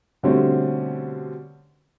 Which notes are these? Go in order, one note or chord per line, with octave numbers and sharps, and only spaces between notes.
B2 D3 G3 A3 C4 C#4